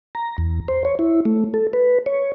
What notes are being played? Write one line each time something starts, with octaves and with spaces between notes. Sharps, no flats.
A#5
E2
C5
C#5
E4
A3
A4
B4
C#5